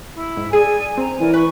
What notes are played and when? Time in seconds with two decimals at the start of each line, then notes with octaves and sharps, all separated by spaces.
0.14 E4
0.37 G#2
0.53 G#4 D5 G#5
0.98 C4 A#5
1.20 E3 A#4 D5 G#5
1.34 B4 C#6